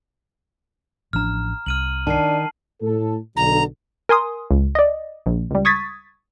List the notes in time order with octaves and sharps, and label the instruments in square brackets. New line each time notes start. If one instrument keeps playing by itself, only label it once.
[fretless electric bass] A1 F3 D4 [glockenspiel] A#5 F6
[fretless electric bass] C2 [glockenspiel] F6 D#7 F#7
[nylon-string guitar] D#3 [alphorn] D4 [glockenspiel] A5 C7
[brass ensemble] A2 A4
[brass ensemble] B1 D3 [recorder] A#5
[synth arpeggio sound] A#4 G#5 C6 D#6
C#2
D5 D#5
A#1
C#2 G3
C#6 D#6 G#6 A6 B6